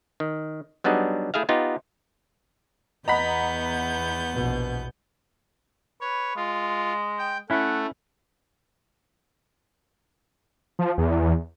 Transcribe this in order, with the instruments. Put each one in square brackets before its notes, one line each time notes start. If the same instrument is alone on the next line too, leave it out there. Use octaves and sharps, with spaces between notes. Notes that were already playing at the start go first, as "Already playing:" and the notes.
[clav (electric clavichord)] D#3
F#3 G3 B3 D4 D#4 G#4
A3 E4 G#4 E5 F5
B3 D#4 F4 G4
[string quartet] E2 B3 G6 [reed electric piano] D#5 F#5 [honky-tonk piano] A#5 B5 B6
[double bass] A#1 B2
[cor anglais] B4 [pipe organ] C#5
[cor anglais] G#3 [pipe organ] F4
[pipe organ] G5
[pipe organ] A3 [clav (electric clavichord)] C#4 E4 [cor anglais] F#5
[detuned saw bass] F3
E2